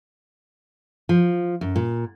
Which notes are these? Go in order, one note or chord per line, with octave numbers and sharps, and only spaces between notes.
F3
F#2
A#2